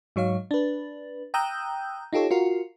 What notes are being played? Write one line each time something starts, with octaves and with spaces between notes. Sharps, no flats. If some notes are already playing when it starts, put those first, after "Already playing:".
G#2 F#3 C#5 F5
D4 B4
G5 A#5 D#6 E6 F#6 G6
D#4 F4 G4 A4 C#5
F4 F#4 A#4